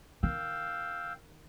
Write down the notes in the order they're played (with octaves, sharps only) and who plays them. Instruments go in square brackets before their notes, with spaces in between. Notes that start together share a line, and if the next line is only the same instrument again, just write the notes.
[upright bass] D#3 [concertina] F5 G5 E6